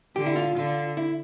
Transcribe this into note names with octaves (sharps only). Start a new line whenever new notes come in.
D3 G4
E4
F4
D3 F4
E4